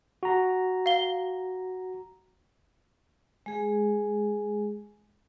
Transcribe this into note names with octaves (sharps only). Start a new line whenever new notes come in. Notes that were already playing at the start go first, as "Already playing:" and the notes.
F#4 A#5
F5 G7
G#3 G#4